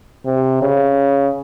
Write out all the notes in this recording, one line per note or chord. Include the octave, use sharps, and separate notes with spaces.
C3
C#3